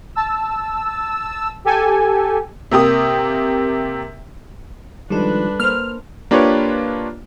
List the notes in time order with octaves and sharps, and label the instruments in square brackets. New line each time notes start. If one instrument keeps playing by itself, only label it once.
[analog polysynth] A5 E6
G4 A4 G#5
[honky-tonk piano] C3 A#3 G4 D#6
[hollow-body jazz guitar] D#3 F3 G#3 [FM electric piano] G3 A4 [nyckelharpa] D4 B4
[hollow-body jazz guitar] A#3 C5 [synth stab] F6
[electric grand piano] A#3 D4 F4 G4 B4 C#5